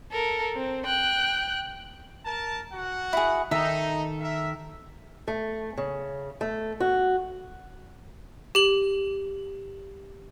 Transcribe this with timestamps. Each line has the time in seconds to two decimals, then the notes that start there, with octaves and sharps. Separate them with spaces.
0.11 A4 A#4
0.55 C4
0.85 G5 F#6
2.25 A#4 A5
2.73 F#4 F#5
3.13 E4 G#4
3.51 D#3 D#4 A4 E5
4.20 A#4 E5
5.28 A3
5.77 C#3
6.41 A3
6.80 F#4
8.55 G4 F#7